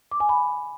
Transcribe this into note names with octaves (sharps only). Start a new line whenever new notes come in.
D6
G#5
B5